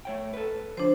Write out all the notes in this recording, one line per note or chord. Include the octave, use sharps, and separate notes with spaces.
A3 C#5 G5
A4 B4
C#2 F3 D4 C5